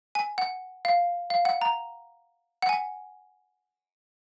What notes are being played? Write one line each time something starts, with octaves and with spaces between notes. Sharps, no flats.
G#5
F#5
F5
F5
F#5
A#5
F#5
G#5